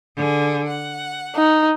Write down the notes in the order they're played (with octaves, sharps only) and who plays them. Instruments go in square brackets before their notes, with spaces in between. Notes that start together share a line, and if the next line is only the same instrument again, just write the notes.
[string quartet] D3 G#4
F#5
[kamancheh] D#4